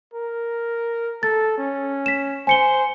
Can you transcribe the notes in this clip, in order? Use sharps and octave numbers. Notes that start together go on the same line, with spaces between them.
A#4
A4 A6
C#4
B6 E7
C5 G#5 C#7 G7